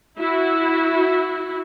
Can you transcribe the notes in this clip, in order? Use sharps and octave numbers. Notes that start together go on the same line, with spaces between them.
E4 F#4